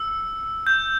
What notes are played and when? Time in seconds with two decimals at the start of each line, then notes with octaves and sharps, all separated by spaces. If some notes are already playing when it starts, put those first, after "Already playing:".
Already playing: E6
0.67 G6